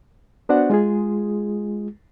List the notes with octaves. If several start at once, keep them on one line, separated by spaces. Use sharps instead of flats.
B3 D4 F#4 C5 D5 F#5
G#3 F4 G#4